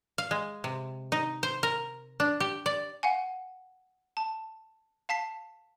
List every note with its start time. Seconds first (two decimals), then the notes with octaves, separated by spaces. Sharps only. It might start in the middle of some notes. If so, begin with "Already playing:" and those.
0.18 F5
0.31 G#3
0.64 C3
1.12 D#4
1.43 C5
1.63 A#4
2.20 D4
2.40 G4
2.66 D5
3.03 F5 F#5 G#5
4.17 A5
5.09 F5 A5 B6 C7